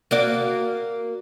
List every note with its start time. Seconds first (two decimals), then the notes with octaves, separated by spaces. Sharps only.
0.11 A#3 F#4 D5